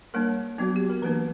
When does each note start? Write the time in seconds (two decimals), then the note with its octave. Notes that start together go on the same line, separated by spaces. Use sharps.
0.14 G3 A#3 D4 A#4
0.58 F#3 B3 D4 F#4
0.76 G4
0.90 A#4
1.02 E3 A#3 D4 B4